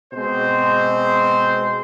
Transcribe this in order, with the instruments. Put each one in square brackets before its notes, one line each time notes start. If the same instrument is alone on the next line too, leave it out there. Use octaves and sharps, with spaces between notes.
[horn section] B2 G#3 C4 C5